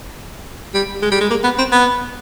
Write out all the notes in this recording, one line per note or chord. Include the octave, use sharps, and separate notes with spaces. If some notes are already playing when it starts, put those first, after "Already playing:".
G3
G#3
G3
G#3
A#3
B3
C4
B3